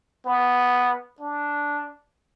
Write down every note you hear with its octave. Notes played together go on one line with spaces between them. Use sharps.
B3
D4